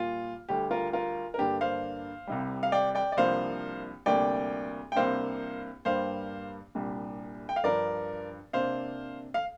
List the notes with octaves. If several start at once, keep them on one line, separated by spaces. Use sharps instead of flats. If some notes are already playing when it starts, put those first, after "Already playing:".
Already playing: A#2 G3 A#3 F4
D2 D3 G3 G4
F4 A#4
F4 A#4
A#4
G2 D3 A#3 D4 G4
C5 F5
C2 C3 G3
F5
D5 G5
D5 G5
D5
C2 C3 F3 A#3 D4 C5 F5
D2 C3 G3 A#3 D4 D5 G5
G5
C2 C3 A#3 D4 C5 F5
G2 G3 A#3 D4 C5 F5
C2 A#2 G3 D4
G5
F5
G2 F3 D4 A#4 D5
C3 A#3 D4 C5 F5
F5